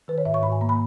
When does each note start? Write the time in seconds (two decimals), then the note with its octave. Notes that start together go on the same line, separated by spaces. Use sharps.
0.08 D#3 B4
0.18 C#5
0.25 G#2 E5
0.34 C#6
0.43 G#2 B5
0.52 G#5
0.61 A#3 A#5
0.69 B5